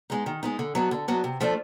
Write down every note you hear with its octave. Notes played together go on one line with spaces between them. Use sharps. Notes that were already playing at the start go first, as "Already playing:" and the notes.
G#3 B3 D#4
D#3
G#3 B3 D#4
D3
F#3 B3 D4
D3
F#3 B3 D4
C3
F3 A3 D4